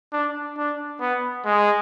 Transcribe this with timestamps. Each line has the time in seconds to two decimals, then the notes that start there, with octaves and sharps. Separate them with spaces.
0.13 D4
0.57 D4
1.00 B3
1.45 G#3